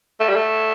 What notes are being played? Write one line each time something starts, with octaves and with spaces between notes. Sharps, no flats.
A3
G3
A3